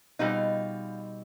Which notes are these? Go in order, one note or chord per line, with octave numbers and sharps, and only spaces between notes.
B2 G3 C4 D#4 F4